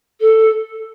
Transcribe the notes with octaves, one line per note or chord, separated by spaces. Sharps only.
A4